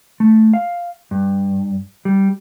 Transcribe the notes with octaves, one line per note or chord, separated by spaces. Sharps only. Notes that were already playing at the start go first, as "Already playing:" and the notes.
A3
F5
G2
G3